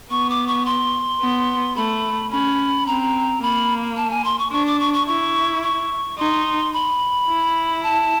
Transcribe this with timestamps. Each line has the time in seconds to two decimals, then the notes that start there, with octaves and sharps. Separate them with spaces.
0.10 B3 C#6
0.30 D6
0.47 C#6
0.66 C6
1.21 B3
1.76 A3 B5
2.31 C#4 B5
2.87 C4 A#5
3.41 A#3 B5
3.97 A5
4.10 G#5
4.25 C6
4.39 C#6
4.52 D4 C#6
4.66 D6
4.80 C#6
4.93 C#6
5.07 E4 C#6
5.63 C#6
6.18 D#4 C6
6.73 B5
7.28 E4
7.83 A5